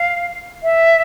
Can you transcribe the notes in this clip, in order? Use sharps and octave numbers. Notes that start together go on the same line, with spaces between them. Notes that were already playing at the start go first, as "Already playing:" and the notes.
Already playing: F5
E5